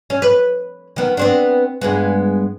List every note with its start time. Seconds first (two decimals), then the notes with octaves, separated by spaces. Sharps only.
0.10 C#4
0.22 B4
0.96 D#3 B3
1.17 B3 C4 D4
1.81 G2 G#3 B3